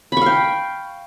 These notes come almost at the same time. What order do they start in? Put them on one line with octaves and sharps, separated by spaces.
B5 C#6 F5 G5